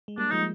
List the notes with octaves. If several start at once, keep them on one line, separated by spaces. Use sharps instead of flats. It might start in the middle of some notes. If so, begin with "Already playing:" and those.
G#3
G3 A#3 D4
F3 G#3 D#4